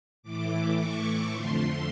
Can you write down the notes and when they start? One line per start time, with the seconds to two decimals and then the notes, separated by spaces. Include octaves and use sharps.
0.23 A2 E3 A3 D6
0.76 C#6
1.30 F2 D3 F3 A3 C6